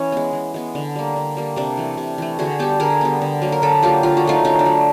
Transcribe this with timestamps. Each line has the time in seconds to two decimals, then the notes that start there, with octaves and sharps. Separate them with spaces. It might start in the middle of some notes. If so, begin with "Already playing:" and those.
Already playing: E3 C#4
0.12 G#3 B3
0.33 E3
0.54 G#3 B3
0.75 D3
0.96 G3 A#3
1.16 D3
1.37 G3 A#3
1.56 C3 D4
1.77 E3 A3
1.97 C3
2.18 E3 A3
2.39 D3 F#4 G#4
2.59 G3 B3 G4 A4
2.80 D3 G#4 A#4
3.01 G3 B3
3.22 D3
3.42 F#3 A#3
3.52 A#4
3.62 D3 A4 B4
3.83 F#3 A#3 F4 G4
4.03 D3 F4
4.17 F#4
4.25 F#3 A3 D#4 F4
4.45 D3 C#4 D#4
4.59 D4
4.65 F#3 A3